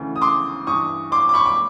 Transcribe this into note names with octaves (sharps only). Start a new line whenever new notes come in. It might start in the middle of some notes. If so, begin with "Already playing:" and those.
Already playing: D2 C#3 E3
D#6
C6 D6
G2 E3 C#6 D#6
C6 D6
D6
B5 C#6
D6